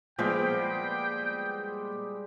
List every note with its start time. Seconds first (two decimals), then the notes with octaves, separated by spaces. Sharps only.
0.19 A#2 F3 G3 G#3 B3 G4 G5